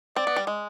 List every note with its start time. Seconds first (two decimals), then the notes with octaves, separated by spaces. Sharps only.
0.16 C4 D5
0.27 B3
0.36 G3
0.47 G#3